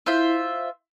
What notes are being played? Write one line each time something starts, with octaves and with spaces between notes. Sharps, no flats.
E4 F4 C5 E5